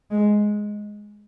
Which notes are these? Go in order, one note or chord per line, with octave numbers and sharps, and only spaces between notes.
G#3